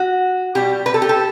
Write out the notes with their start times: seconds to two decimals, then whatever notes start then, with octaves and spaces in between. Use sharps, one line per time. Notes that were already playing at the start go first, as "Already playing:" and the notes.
Already playing: F#4
0.55 B2 G3 G4
0.86 B4
0.94 A4
1.02 G4
1.09 A4